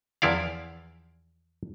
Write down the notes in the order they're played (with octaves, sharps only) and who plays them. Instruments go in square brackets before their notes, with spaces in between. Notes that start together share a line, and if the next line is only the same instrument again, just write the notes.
[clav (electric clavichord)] E2 F3 E4 D5 F5